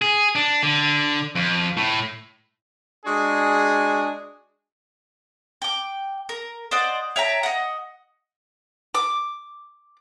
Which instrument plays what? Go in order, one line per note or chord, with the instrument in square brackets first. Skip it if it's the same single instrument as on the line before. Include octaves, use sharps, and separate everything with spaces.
[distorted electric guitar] G#4
D4
D3
F2
A2
[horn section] G#3 D4 F#4 G#4
[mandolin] G5 D6
A#4
C5 D5 D#5 F#5
C#5 E5 G5 A#5
D#5 F#5
D6